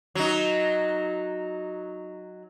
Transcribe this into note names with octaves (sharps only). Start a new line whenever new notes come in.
F#3 D#4